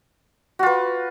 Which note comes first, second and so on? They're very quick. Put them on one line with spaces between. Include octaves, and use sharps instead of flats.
F#4 F4 B4